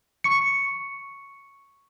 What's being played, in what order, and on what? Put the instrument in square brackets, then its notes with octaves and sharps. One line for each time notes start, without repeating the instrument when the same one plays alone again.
[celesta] C#6 C#7